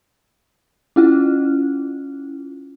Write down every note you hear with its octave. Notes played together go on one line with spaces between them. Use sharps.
C#4 E4 F4